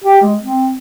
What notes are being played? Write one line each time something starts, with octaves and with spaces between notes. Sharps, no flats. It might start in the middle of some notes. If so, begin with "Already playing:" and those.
G4
G#3
C4